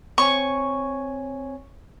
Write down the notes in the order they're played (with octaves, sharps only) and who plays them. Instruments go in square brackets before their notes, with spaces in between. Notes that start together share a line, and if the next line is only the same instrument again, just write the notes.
[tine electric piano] C4 C#5 G#5 [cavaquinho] C#6